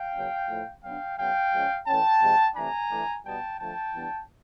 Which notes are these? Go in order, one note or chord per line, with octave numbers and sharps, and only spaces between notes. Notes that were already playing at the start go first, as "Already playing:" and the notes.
Already playing: F5 G5
C#3 F#3 A#3 C#4
A2 F3 A3
B2 F#3 B3 D4 F5 G5
C#3 F#3 B3 F5 G5
F3 G#3 C#4
E3 A3 C#4 G5 A5
C3 F3 G#3
C3 E3 A3 D4 G#5 A#5
E3 A3 D4
B2 G3 B3 D#4 G5 A5
D3 F3 A3 G5 A5
E3 G3 B3 D4